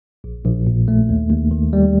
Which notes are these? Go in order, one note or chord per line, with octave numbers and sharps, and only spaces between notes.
A#1
A#1
A#2
A3
D#2
D#2
D#3
G3